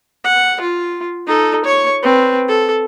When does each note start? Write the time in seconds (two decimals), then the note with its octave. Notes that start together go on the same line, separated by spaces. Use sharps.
0.24 F#5
0.61 F4
1.27 D#4 A4
1.65 C#5 C#6
2.03 C4 B4
2.48 A4